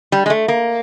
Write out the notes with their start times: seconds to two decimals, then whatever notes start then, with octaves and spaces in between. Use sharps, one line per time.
0.12 G3
0.26 G#3
0.30 A3
0.48 A#3